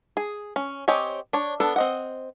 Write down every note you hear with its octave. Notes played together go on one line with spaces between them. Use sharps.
G#4
C#4
C4 G4 C#5 D#5 G#5
D4 C#5
B3 D4 A4
C4 D#5 F#5